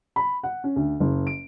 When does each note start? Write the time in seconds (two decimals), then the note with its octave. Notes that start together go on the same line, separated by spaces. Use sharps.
0.16 B5
0.43 F#5
0.64 C#4
0.76 D2
1.00 F#1
1.27 D7